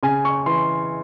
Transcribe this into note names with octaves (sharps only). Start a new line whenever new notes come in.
C#3 G#5
C#6
E3 C6